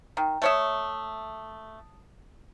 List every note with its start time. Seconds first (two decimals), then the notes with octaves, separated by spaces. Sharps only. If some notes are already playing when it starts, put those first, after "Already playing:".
0.17 D#3 G5 A#5
0.42 A3 C#5 E5 A5 D#6